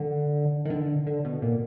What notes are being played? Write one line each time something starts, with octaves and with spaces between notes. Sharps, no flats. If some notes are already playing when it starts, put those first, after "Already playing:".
Already playing: D3
D#3
D3
D3
B2
A#2